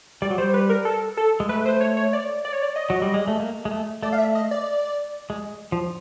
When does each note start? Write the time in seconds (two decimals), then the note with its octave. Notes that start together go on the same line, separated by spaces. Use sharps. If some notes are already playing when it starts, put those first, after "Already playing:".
0.22 G3 D5
0.30 F#3
0.38 G3 C5
0.54 B4
0.70 A#4
0.85 A4
1.17 A4
1.40 G#3
1.49 A3 B4
1.66 C5
1.81 C#5
1.97 C#5
2.13 D5
2.45 D5
2.53 C#5
2.62 D5
2.76 D#5
2.90 F#3
3.02 G3
3.14 G#3
3.28 A3
3.40 A#3
3.65 G#3
3.71 A3
4.03 A3 D5
4.13 F5
4.18 E5
4.35 D#5
4.51 D5
5.30 G#3
5.72 F3